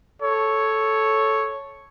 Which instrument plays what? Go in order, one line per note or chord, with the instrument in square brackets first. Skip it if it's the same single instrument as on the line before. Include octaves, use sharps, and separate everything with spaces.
[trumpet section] A4 C#5